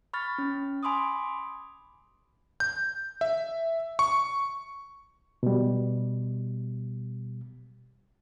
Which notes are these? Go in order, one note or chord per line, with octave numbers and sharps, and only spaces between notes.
B5 C#6 F6 A6
C#4
G#5 B5 C6 D6 D#6
G6
E5
C#6
B2 G3